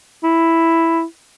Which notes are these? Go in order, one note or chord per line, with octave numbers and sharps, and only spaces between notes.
E4